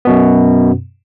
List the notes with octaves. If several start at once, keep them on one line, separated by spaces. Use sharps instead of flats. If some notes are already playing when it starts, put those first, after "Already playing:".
F#2 B2 B3